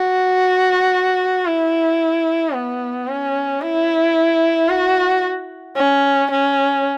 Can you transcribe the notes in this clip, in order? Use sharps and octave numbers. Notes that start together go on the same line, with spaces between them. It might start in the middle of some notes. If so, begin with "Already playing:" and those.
Already playing: F#4
E4
B3
C#4
E4
F#4
C#4
C#4